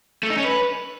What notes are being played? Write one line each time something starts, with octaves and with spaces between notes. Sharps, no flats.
A3
D#4
C#4
B4